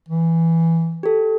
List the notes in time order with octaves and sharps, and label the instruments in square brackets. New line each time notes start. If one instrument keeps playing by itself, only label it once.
[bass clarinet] E3
[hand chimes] G4 A4